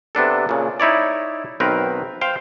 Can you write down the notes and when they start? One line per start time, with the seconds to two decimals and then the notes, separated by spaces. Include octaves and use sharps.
0.15 C3 B3 D4 A4
0.49 A#2 C#3
0.80 D#4 E4 C#5 D5
1.60 B1 D#3 C4 A#4 B4
2.21 C5 F5 G5